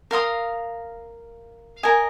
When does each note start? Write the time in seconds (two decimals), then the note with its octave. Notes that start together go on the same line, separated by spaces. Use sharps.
0.11 A#4 F5 C6 D#6
1.83 A#4 D#5 G#5